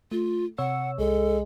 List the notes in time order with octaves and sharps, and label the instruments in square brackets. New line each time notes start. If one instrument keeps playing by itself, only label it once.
[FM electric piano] A3 [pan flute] F4
[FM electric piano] C3 C#5 E6 [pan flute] F#5
[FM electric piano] C2 [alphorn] G#3 [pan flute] A4